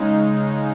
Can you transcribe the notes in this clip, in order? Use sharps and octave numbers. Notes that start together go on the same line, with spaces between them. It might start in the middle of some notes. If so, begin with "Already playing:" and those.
Already playing: C#3 G#3 D#4